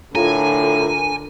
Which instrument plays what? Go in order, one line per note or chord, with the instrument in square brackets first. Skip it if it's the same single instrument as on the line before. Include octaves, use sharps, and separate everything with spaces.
[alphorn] A2 [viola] D3 A#4 [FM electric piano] F4 A4 A#5 [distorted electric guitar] G#5